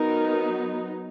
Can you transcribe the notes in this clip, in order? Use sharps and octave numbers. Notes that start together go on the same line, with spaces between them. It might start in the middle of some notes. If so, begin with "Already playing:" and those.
Already playing: F#3 B3 D#4 A#4